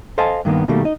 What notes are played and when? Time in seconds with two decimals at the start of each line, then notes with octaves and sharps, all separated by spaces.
0.18 A4 C5 D#5 F5 G#5 A5
0.45 G2 D#3 A#3 B3
0.68 B2 D#3 G3 A3 A#3
0.85 D#4 D#5